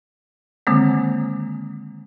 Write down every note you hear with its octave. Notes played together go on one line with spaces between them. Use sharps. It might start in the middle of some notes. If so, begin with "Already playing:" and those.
D3 D#3 G#3 A#3 C4